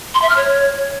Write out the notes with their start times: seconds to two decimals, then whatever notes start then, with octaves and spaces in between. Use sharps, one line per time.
0.14 C6
0.22 E5
0.29 F6
0.36 C#5